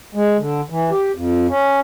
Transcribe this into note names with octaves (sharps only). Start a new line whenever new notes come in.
G#3
D3
E3
G4
F2
C#4